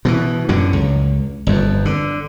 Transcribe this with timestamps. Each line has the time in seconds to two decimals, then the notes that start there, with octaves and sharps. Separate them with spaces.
0.05 B2 D3 E3
0.49 F#2 A2 D3
0.73 C#2
1.47 G1 F2
1.85 D3